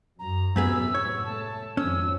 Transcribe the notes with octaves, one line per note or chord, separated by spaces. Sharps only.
F#2 A#5
F#2 A2 C3 B3 G#4 E6
C#5
A3 A5
G#1 F2 G#2 C#4 E6